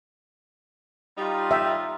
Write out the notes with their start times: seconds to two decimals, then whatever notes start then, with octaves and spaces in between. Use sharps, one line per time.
1.18 G3 D#4 F4
1.51 E5 G5